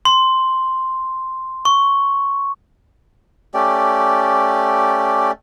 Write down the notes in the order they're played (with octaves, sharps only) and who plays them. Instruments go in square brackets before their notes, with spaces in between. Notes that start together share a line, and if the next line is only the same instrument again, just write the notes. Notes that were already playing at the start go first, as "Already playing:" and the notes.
[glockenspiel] C6
C#6
[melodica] A3 C#4 G4 D5